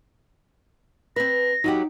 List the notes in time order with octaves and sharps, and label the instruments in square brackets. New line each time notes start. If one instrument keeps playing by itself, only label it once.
[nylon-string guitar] C4 B4 [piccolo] A#6
[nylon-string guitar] F#3 F#4 G4 [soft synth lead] D#4